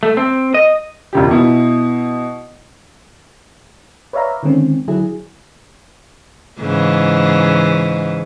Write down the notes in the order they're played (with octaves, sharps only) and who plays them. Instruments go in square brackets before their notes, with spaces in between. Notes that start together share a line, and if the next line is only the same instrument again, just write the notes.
[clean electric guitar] A3
C4
D#5
[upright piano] E1 C#2 G4
B2 E4
[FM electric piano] B4 C#5 D5 E5 F5 A#5
D3 D#3 G#3 C4 C#4
D3 F#3 E4 G#4
[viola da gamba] G#2 C#3 E3